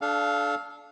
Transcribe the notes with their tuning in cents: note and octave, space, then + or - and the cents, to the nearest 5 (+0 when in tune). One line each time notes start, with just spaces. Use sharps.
D4 +0 A4 -30 F5 +0